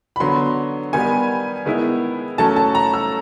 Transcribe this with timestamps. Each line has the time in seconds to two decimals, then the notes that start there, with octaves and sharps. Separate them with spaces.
0.16 B5
0.20 D3 F#3 B3 C6
0.93 D#3 G3 B3 G#5
1.66 D#3 G#3 B3 E4
2.38 F#3 A3 C#4 A5
2.56 A5
2.75 A#5
2.94 E6